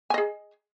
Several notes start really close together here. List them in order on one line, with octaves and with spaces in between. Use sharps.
G#5 D#5 G#4